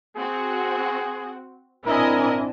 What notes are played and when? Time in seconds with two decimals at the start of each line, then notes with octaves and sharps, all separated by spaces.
0.17 C4 F#4 G#4
1.86 C4 D4 E4 A#4 D#5 G#5